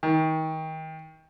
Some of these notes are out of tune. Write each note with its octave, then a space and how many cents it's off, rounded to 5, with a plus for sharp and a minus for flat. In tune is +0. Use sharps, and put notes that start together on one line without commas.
D#3 +30